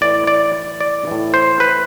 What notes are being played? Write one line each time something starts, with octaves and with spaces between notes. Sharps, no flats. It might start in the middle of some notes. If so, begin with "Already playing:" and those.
A2 E3 D5
D5
D5
A2 E3
C5
B4